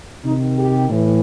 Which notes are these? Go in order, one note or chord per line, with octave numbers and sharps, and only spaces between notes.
C3 D#3 D#4
G4
A2 E3